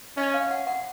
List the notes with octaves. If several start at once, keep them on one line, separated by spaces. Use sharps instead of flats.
C#4 D#5
F5
F#5
F#5